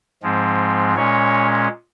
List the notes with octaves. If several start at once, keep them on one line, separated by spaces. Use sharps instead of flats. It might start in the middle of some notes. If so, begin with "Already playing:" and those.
G#2 F3 G#3 C4
A#2 G#3 C#4 C#5